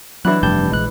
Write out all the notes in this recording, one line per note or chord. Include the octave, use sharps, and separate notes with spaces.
E3 F#3 D4 E4 F#6
F1 G2 G4 A5 G6
A#1 G#3 F#6